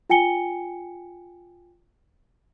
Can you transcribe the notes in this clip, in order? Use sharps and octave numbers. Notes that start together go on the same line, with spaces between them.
F4 G5 G#5 C#7 G7